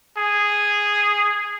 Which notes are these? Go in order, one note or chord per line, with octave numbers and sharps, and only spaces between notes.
G#4